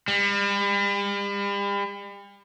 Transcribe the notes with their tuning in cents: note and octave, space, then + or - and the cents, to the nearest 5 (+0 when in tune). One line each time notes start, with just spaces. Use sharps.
G3 +40